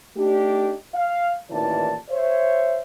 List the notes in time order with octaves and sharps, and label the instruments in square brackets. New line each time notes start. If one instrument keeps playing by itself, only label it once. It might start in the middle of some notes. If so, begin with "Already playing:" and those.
[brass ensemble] A3 D4 D#4 G4
F5
A1 A#2 D#3 E3 D5 A5
C5 C#5 E5